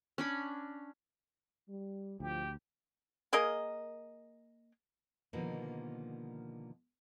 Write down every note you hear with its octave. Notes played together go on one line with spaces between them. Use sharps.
C#4 D4 B5
G3
D2 A2 F3 G4
A#3 G#4 A#4 D#5
B2 D3 D#3 F3 G3 A#3